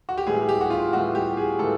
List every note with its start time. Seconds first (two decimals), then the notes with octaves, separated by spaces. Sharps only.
0.09 F#4
0.18 G4
0.27 A2 E3 G3 G#4
0.49 G4
0.61 F#4
0.70 F4
0.93 A2 E3 G3 F#4
1.15 G4
1.37 G#4
1.59 A2 E3 A4